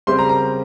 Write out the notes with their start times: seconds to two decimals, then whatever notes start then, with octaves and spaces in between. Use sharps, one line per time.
0.07 C#3 G3 C4 G4 C5 C6
0.19 A#5
0.29 A#5